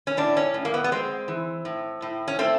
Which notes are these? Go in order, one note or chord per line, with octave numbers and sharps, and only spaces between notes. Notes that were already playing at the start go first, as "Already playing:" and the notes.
C#4
A2 D4
C#4
A2
A#3
B3
B3
G#3 C4
E3
A2
A2
C#4
A3 C4